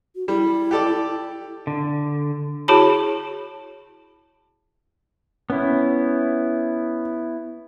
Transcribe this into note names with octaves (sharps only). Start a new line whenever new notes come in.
F#4
G3 E4
G4 A4 D5
D3
E4 F#4 G#4 C#5 A5 B5
B3 C#4 E4